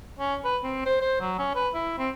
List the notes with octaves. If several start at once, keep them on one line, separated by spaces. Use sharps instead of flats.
C#4
B4
C4
C5
C5
F#3
C#4
B4
E4
C4